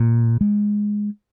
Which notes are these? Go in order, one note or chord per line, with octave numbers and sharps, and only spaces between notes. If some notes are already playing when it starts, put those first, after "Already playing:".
Already playing: A#2
G#3